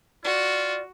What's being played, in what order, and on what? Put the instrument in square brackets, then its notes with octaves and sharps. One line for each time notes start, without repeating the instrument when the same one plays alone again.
[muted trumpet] F4 [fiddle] F#4 [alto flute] D5